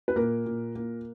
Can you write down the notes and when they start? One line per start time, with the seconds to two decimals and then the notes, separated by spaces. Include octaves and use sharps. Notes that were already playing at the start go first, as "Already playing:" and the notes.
0.08 B4
0.16 A#2 A#3 A#4
0.46 A#2
0.75 A#3